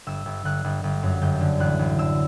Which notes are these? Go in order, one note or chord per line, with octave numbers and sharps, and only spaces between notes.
G1 E6
G1
G1 F#6
G1
G1
F#2
G1 G6
D3
A1 F#6
A1
D3 E6